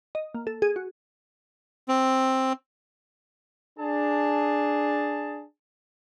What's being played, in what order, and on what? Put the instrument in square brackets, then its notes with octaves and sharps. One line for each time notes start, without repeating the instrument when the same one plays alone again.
[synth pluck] D#5
A#3
A4
G#4
F#4
[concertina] C4
[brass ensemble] D4 G#4 A5